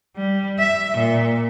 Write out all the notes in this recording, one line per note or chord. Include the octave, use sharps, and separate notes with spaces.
G3
E5
A#2